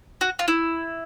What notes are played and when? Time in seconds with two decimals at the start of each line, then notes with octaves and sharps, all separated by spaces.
0.21 F#4
0.39 F4
0.48 E4